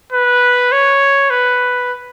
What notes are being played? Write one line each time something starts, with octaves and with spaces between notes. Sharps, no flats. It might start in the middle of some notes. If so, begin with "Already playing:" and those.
B4
C#5
B4